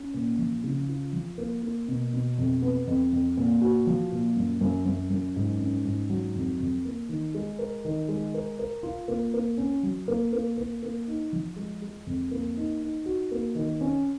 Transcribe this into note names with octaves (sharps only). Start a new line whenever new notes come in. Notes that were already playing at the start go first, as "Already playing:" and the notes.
Already playing: C#4
A#2
F3
C#3
F4
F3
A#3
A#3
B2
B2
F2
B3
F2
F2
A#2
F#4
F3
A#2
F#2
F#2
F#2
F#2
G#2
C#4
G#2
F#3
F2
F2
A#3
D#3
G#3
A#4
D#3
G#3
A#4
A#4
F4
A#3
A#3
C#4
F#3
A#3
A#3
A#3
A#3
D#4
F3
G#3
G#3
F2
A#3
D#4
D#4
F#4
A#3
D#3
C#4